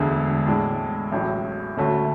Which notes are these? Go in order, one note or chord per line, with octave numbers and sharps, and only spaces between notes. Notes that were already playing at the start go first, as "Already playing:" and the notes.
Already playing: E1 D2 D3 G#3
A2 G#3 D4
A1 A2 F#3
D2 D3 A3 C#4 F#4